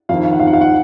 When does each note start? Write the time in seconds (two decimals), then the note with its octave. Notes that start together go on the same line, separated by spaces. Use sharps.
0.09 F2 D#3 F5
0.24 F5
0.33 F#5
0.40 F2 D#3 F5
0.47 F#5
0.53 F5
0.61 F#5